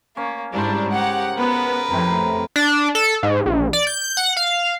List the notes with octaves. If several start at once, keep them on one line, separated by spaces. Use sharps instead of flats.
A#3 C#4
G#2 C#3 G3 D4 E4 A#4 C5
G4 F#5 G#5 A#5
B3 A#4 B4
F2 A2 C3 A#5
D4
A4
G#2
A#1
D5
G6
F#5
F5